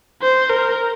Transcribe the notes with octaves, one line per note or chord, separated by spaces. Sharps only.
C5
A#4